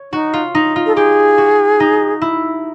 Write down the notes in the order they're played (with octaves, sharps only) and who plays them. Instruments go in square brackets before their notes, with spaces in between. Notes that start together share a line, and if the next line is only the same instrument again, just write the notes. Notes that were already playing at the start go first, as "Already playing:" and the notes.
Already playing: [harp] C#5
[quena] D#4 [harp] F#4
[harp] F4
D#4
F4
[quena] A4
[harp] G4 [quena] G#4
[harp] F#4
D#4
E4